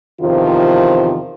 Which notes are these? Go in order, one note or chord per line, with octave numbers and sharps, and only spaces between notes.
E2 C3 D#3 F3 F4